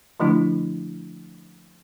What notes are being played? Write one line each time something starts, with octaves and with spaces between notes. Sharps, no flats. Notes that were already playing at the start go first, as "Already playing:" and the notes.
D3 F3 A3 D4 E4